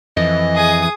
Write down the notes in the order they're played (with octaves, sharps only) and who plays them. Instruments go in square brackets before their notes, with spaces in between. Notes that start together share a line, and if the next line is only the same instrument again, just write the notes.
[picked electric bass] F2 [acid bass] E3 [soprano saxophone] D#5
[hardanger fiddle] G#4 D#6